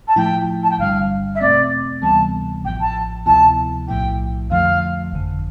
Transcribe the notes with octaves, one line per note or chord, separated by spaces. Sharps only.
A5
A2 F3 A3 E4 G5
A5
G5
G1 G2 D3 G3 F5
E5
E2 B2 A3 C4 D5
D2 C3 E3 G3 B3 A5
A1 A2 F3 G5
A5
D2 C3 F3 B3 E4 A5
B1 A2 F3 A3 E4 G5
F2 D3 F3 A3 F5
G1 F2 D3